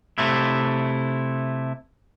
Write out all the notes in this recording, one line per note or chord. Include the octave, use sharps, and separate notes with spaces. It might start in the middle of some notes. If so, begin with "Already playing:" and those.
C3 A3 E4